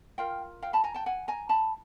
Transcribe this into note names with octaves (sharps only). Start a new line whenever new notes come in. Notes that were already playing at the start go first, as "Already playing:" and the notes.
F4 A#4 F5 G5
F5 G5
A5 B5
G#5 A#5
G5 A5
F#5 G#5
G#5 A#5
A5 B5